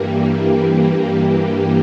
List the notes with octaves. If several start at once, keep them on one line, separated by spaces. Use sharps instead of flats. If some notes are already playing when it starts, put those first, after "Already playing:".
Already playing: G2 E3 G3 A#3